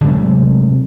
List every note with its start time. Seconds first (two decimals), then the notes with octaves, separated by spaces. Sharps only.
0.01 C3 F#3 G#3 A3